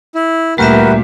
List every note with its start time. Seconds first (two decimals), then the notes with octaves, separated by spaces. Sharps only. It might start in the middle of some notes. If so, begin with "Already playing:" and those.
0.15 E4
0.58 D2 A#2 G3 F#4 G4 A#4 B4 E5